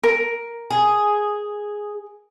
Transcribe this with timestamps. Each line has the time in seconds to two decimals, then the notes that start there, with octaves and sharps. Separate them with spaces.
0.03 A#4
0.70 G#4